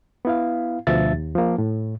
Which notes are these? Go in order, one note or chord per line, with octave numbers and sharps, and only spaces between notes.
B3 E4 F5
D2 B2 F3 E5 A6
D#2
F3 A#3
A2